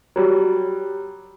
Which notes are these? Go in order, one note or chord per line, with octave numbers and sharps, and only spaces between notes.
F#3 G3